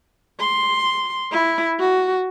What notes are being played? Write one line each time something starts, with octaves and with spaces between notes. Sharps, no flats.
C6
E4
F#4